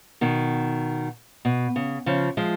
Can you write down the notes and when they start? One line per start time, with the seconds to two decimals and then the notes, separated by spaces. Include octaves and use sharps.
0.21 B2 D#3
1.45 B2
1.76 C#3
2.06 C#3 F3
2.37 F3 G#3